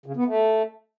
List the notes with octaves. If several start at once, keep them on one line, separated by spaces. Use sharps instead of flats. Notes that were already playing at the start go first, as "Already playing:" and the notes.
C#3
B3
A3